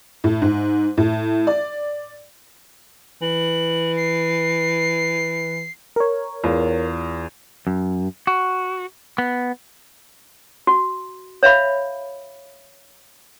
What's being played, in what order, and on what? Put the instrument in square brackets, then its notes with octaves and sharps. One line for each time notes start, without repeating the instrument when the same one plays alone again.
[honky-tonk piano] A2
G#2
A2
D5
[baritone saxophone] E3 [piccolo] F#7
[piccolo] C7
[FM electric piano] A#4 C#5
[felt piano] E2 F4
[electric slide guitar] F#2
F#4
B3
[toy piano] F#4
C#5 E5 F5 B5